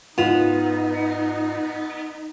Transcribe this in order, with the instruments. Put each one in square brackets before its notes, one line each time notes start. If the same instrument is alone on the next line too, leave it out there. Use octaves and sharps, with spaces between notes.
[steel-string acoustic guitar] G#2 [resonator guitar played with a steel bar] B3 [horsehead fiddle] D#4 [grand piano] F4 F7